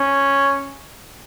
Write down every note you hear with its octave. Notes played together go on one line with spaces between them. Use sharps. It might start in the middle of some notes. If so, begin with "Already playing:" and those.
Already playing: C#4